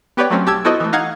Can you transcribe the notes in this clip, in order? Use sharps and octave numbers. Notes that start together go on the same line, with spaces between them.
B3 G4 B4 C#5 D5 G5
F#3 A3 C4 C#4
B1 G4 A5 E6 G#6
B3 E4 F#4 A4 C5 D#5
E3 A3
D#4 F5 F#5 G#6